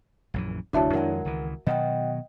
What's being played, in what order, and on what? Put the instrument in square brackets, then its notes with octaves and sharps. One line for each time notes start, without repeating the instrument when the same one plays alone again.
[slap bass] A#1 F#2 E3
[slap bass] F1 D2 [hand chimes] D4 E4 C#5 [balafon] F#4 E5 A5
[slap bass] F2 D#3 G#3 [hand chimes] A#4 F#5 G#5
[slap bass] C#2 D#3 E3
[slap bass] B2 D#3 F#3 [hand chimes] D#5 F#5 G5